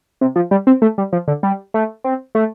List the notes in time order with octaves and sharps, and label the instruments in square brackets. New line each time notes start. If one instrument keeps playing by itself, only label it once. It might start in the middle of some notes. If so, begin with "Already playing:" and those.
[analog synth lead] C3
F3
G3
C4
A3
G3
F3
D3
G3
A3
C4
A3